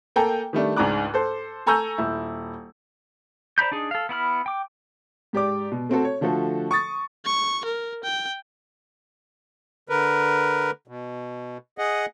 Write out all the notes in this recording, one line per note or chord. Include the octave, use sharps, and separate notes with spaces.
A#3 A4 G5 G#5 A#5
D#3 G3 A3 D4
C#2 G#2 D4 A#5 D6 F#6
A4 C5
A4 G#5 A#5 C#6 E6 G6
D#1 E4
C5 D5 A#5 B5 G6
D4 D#4 G#4
A4 F5
B3 E4 B5 F6
G5 D6
G#2 G4 D5 D6
B2
A3 C4 F#4 A4
C#5
D3 F3 A3 F#4 A4
C#6 D#6 A6
C#6
A#4
G5
D3 A#4 B4
B2
G#4 D#5 F#5